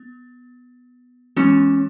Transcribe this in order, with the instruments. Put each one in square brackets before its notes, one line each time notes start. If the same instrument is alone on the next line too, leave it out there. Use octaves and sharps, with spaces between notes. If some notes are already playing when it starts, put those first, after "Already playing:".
Already playing: [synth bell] B3
[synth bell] E3 G#3 B3 F#4 [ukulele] C#4